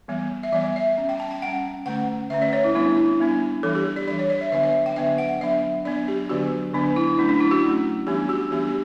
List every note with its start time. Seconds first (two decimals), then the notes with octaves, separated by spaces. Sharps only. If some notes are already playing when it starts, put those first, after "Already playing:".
0.08 E3 G3 B3
0.43 E5
0.53 E3 G3 B3 D5
0.76 E5
0.97 G3 C#4
1.09 G5
1.20 A5
1.31 G5
1.42 G3 C#4 F#5
1.86 D3 A3 C#4 F#5
2.30 D3 A3 C#4 E5
2.42 D5
2.53 C#5
2.64 E4
2.75 G3 B3 D4 E4
2.97 E4
3.20 G3 B3 D4
3.63 E3 G3 D4 A4
3.75 G4
3.96 D5
4.07 E3 G3 D4 D5
4.19 C#5
4.30 D5
4.41 E5
4.52 D3 F#3 B3 D4 E5
4.63 E5
4.86 G5
4.96 D3 F#3 B3 D4 E5
5.18 F#5
5.41 F#3 B3 D4 E5
5.85 F#3 B3 D4 D5
6.08 G4
6.29 D3 F#3 B3 D4 F#4
6.73 D3 F#3 B3 D4
6.96 E4
7.18 F#3 A3 C#4 D4
7.29 D4
7.40 E4
7.51 F#4
7.63 F#3 A3 C#4
8.07 E3 G3 B3 D4 G4
8.29 F#4
8.51 E3 G3 B3 D4 G4
8.67 G4